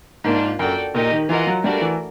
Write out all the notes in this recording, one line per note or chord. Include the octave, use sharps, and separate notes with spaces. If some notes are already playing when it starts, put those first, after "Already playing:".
G#2 A#3 D4 F4
F#2 F#4 A4 D5 G5
A#2 D#4 G4 A#4 D#5
D#3
E3 F4 A#4 D#5 F#5
F#3
G3 A3 D4 F#4 A#4 D5
E3